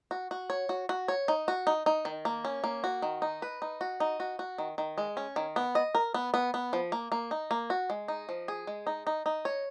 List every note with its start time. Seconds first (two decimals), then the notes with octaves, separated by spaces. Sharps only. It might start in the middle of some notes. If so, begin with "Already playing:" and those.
0.11 F#4
0.31 F#4
0.50 C#5
0.69 F#4
0.89 F#4
1.08 C#5
1.28 D#4
1.48 F#4
1.67 D#4
1.86 D#4
2.05 D#3
2.25 A#3
2.45 C#4
2.64 A#3
2.84 F#4
3.02 D#3
3.22 D#4
3.42 B4
3.62 D#4
3.81 F#4
4.00 D#4
4.20 F#4
4.39 F#4
4.58 D#3
4.78 D#3
4.98 G#3
5.17 C#4
5.36 D#3
5.56 B3
5.75 D#5
5.95 A#4
6.14 B3
6.34 B3
6.54 B3
6.73 F3
6.92 A#3
7.12 A#3
7.31 D#4
7.51 A#3
7.70 F#4
7.90 G#3
8.08 D#4
8.29 F3
8.48 G#4
8.67 G#3
8.87 D#4
9.07 D#4
9.26 D#4
9.45 C#5